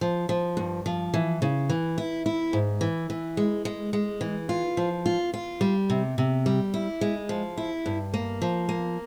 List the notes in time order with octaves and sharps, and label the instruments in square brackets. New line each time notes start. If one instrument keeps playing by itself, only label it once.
[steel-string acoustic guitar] F3
F3
G2
F3
E3
C#3
E3
E4
E4
G#2
E3
E3
G#3
G#3
G#3
E3
F4
F3
F4
F4
G3
C3
C3
G3
E4
G#3
F3
E4
G2
A#3
F3
A#3